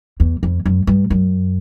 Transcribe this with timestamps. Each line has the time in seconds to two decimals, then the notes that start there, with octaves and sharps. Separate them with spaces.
0.20 E2
0.43 F2
0.66 F#2
0.87 G2
1.10 F#2